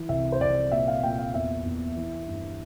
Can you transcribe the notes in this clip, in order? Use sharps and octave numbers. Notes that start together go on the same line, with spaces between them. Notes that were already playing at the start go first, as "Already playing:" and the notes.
Already playing: E3
C2 E5
C5
C2 D5
A#2 E5
F5
A#2 G5
F5
E2 E5
E2
E3
G2